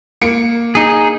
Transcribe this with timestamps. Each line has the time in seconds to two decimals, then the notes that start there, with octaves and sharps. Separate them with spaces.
0.22 A#3 C#7 D7
0.75 D#4 G#4